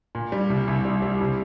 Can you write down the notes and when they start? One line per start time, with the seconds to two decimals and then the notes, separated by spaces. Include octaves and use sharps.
0.15 A#2
0.32 G3
0.50 C2
0.67 C2
0.85 G3
1.02 G3
1.21 C3